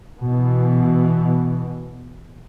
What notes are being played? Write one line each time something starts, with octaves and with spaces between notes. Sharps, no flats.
B2 E3